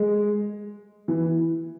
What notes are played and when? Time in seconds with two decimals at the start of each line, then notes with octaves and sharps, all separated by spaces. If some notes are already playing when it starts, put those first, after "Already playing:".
Already playing: G#3
1.08 E3